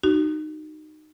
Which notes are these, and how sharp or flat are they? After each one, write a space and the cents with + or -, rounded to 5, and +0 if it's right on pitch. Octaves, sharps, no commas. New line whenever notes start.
D#4 -15 F#4 +30